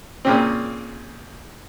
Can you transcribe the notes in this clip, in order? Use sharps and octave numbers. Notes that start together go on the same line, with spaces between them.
A#2 C#3 C4